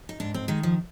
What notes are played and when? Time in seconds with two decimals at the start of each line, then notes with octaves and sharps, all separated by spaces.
0.09 D#4
0.20 G#2 D4
0.34 C4
0.48 D#3 G#3
0.63 F3